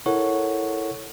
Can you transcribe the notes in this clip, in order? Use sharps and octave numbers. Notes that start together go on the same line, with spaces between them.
E4 A4 A#4 C#5 F#5 C#6